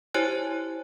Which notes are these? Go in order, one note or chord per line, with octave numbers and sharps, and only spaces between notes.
E4 G4 C5 C#5 G#5 F#6